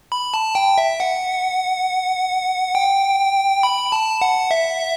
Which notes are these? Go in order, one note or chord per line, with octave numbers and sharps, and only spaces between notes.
B5
A5
G5
E5
F#5
G5
B5
A5
F#5
E5